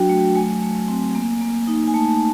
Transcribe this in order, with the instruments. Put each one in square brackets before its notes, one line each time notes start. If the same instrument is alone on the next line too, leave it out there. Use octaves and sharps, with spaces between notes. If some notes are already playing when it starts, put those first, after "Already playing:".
Already playing: [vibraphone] F#3 D4 F#4 G5
A3
A3 G#5
A3
C4
A#3
A#3
D#4
G#5
A3 A5